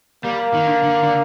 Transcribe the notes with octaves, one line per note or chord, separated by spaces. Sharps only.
G3 A#3
D#3
D3
D3
D3